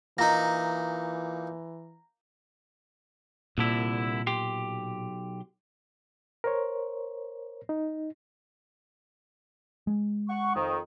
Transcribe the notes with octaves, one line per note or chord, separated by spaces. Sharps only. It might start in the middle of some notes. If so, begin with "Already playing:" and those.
A#2 E3 D#4 A#5 A#6
C2 A#2 D3 E4
B1 G4 C6
A#4 C5 C#5
D#4
G#3
F#5 C#6
F2 D#3